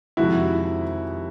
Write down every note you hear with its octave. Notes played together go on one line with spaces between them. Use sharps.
F2 C3 D#3 G#3 E4 F#4